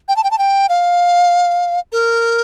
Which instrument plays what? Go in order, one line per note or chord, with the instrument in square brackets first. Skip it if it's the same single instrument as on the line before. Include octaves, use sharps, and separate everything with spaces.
[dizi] G5
A5
G5
A5
G5
F5
A#4